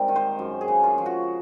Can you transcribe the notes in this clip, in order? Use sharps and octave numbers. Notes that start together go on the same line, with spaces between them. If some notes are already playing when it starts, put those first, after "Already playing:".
Already playing: G#2 G3 C4 A#4
D#3
C5
F#2
G#4
C#3
F4
F3
F#4